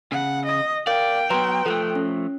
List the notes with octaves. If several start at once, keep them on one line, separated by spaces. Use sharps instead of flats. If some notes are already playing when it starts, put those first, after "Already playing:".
C#3 F#5
D#5
A#4 D5 F5 G5
F#3 B3 B4 A#5 C6
F3 A3 A4 F#6
C#4